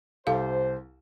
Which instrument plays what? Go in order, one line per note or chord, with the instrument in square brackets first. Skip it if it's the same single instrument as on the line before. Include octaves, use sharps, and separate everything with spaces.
[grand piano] C2 [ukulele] G4 A4 [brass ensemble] C5 [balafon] F5